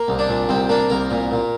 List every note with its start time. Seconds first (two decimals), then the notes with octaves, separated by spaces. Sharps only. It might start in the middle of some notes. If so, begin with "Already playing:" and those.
Already playing: A#3
0.08 C2
0.19 D4
0.29 A#2
0.49 C2 C4
0.69 A#3 D4
0.90 C2 A#4
1.11 A#2
1.31 A#2